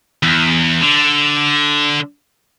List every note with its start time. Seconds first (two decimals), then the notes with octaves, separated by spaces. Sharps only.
0.23 E2
0.82 D3